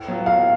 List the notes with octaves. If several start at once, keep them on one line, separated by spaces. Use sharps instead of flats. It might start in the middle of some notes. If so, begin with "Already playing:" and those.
Already playing: A2
F#3 B3 F4
A2 F5